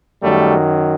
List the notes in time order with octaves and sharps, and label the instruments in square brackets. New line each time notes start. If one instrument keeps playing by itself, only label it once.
[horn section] F#2 D#3 F#3 G3 A3